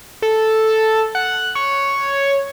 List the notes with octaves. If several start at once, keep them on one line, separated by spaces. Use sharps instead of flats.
A4
F#5
C#5